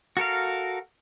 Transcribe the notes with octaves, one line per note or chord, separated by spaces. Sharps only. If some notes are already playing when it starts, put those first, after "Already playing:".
F#4 A4 A#4 F5